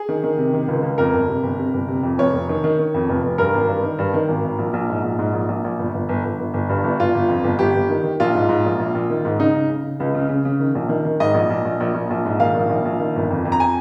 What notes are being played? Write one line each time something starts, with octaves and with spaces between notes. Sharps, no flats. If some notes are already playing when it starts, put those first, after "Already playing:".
Already playing: G#4
D#3
D#3
C3
D#3
C#2
C#2
F2 A#4
G1
C3
G1
C3
G1
C3
F2
F1 C#5
F1
D#3
D#3
D#3
F2
F1
F1
G2 A#4
G#1
G2
D#3
G2
D#3
G#1
G#1
A#1
A#1
G#2
A#1
G#2
A#1
A#1
A#1
G1
G1
G1
G1
G1
G1
G2
G1
G1 F4
G1
F2
G1
G1 G4
G1
D#3
D#3
A#1 F4
G#2
G#2
A#1
A#1
A#1
D#3
G#2
C#3 D#4
C#3
C#3
C#3
C#2
C#3
C#3
C#3
D#3
A#1
D#3
D#3
G#2 D#5
A#1
A#1
A#1
A#1
A#1
A#1
G#2
D#3 F5
A#1
A#1
A#1
D#3
G1
F2
F2
A#5
G#5